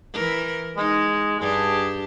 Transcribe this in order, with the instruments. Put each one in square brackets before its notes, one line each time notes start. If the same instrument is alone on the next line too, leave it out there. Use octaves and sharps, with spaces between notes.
[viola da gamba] E3 A#4
[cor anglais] G#3 [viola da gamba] D#4
[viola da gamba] G2 D4 G4 [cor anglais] G#4